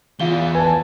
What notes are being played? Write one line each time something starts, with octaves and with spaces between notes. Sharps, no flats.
E2 F4 F5 G7
B4 G#5 A5